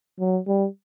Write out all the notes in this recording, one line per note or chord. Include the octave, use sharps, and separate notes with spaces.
F#3
G3